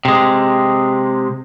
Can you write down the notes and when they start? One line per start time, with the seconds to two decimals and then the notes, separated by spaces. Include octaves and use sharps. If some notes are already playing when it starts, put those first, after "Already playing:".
0.05 C3 G#3